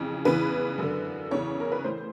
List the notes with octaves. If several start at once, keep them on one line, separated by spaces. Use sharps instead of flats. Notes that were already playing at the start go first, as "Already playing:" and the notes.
Already playing: F2 C#3 E3
E2 C#3 E3 B4
F#2 D3
E2 C#3 E3 C#5
A#4
B4
A2 E3 C5